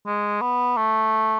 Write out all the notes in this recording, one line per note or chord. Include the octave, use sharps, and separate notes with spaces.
G#3
B3
A3